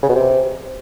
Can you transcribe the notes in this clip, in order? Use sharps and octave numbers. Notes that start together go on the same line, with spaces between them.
C#3
B2
C3